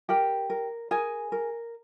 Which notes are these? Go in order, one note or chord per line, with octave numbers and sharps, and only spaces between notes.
G4 A#4 G5
A#4
G#4 A#4 G#5
A#4